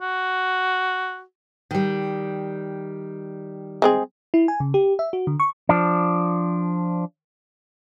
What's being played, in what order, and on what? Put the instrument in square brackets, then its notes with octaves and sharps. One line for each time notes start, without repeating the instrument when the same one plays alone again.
[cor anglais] F#4
[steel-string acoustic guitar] D#3 G3
[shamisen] G#3 C4 G#4
[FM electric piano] E4
G#5
C#3
G4
E5
F#4
D3
C#6
[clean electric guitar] F3 D4